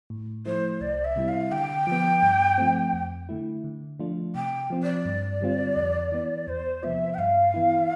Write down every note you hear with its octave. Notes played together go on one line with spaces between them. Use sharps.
A2
F3 A3 E4 C5
C2 D5
E5
C3 G3 C4 E4
F5
D3 G5
F3 B3
G2
F3 A3 C4
F2
D3 A3 E4
D3
F3 A3 D4 F4
C3 G5
F3 C4 F4
D5
G2
D3 G3 C4 F4
F2
E3 B3
E2 C5
C3 F3 B3 F4 E5
G5
G2 F5
E3 B3 E4